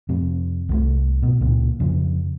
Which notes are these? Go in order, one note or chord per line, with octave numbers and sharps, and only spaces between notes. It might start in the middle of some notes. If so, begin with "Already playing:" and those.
F2 C3
C2 F3 A3
B2
C#2 A#2
F2 C#3